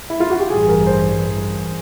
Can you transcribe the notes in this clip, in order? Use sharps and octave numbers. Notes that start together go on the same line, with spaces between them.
E4
F4
F#4
G4
A1 G2 E3 G#4
A#4
C5